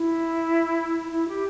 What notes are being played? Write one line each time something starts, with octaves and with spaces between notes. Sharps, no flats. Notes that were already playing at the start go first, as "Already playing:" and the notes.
Already playing: E4
E4
G4